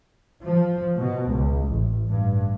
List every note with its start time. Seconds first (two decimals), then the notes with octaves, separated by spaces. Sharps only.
0.43 F3
0.96 B2
1.32 C#2
1.67 A1
2.09 G2